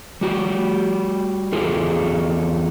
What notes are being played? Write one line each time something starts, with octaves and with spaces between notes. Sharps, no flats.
G3 F#4 G4
E2 F4 G#4 A4